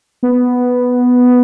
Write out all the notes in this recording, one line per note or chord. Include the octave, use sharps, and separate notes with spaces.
B3